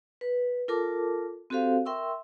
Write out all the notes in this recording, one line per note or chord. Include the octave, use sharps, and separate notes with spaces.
B4
F4 A4 A#4 A5 D6
C4 F#4 G4 A4 C5 F5
A#4 E5 G5 C6 C#6 E6